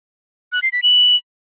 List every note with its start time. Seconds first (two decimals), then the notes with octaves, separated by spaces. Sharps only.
0.52 F#6
0.63 C7
0.73 B6
0.83 F#7